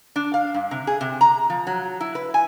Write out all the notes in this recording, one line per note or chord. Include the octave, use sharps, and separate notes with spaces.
D4
F5
G2
C3
G#4
C3
A#5
F3
F#3
E4
B4
G#5